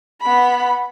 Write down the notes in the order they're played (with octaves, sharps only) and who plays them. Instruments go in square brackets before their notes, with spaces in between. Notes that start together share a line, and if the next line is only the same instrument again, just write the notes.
[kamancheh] B3 B5